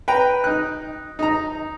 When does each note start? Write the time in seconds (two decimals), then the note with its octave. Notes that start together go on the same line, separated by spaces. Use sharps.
0.08 B4 G5 A#5
0.44 D#4 F#6
1.19 D#4 A#5